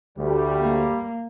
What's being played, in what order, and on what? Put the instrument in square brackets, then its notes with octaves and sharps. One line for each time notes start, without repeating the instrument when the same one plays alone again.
[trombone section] D2 [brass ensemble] G3
[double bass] A#3